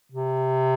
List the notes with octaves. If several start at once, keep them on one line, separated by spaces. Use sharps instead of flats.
C3